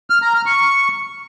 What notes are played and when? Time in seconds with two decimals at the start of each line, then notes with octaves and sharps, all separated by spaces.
0.10 F6
0.22 A#5
0.34 F6
0.46 C#6